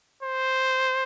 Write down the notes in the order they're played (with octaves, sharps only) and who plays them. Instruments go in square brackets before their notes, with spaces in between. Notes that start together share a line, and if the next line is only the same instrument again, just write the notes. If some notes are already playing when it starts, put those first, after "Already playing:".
[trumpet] C5